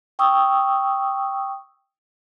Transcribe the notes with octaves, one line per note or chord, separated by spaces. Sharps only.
G5 C#6 D#6 E6